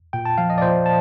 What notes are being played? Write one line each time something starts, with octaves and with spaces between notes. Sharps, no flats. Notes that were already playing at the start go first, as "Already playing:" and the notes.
A#2 G5
A5
F3 F5
D#5
D5
A#2 C5
A5